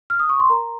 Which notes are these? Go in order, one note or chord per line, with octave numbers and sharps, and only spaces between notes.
F6
D#6
C#6
C6
A#4 A#5